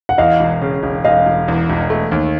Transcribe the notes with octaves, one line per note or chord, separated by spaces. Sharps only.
F#5
E2 D#5 F5
E1
C#3
E1
E1 D#5 F5
E1
E2
E1
A3
D#2